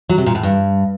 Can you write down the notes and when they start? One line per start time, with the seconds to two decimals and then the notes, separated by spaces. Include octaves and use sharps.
0.09 F#3
0.18 C3
0.26 A#2
0.35 A2
0.43 G2